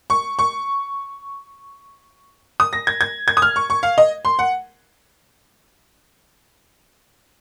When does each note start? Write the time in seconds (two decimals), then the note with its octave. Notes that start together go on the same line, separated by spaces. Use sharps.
0.10 C#6
0.39 C#6
2.60 D#6
2.73 A#6
2.87 G#6
3.01 G#6
3.28 G#6
3.37 D#6
3.42 F6
3.56 C#6
3.70 C#6
3.83 F5
3.98 D#5
4.25 C6
4.39 F#5